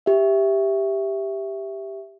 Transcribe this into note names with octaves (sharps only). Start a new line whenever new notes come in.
G4 E5